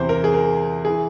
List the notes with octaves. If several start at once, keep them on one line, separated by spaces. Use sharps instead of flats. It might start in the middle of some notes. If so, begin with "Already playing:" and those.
Already playing: E2 C3 E3 C5
A#4
G#4
A#4
E3 G#4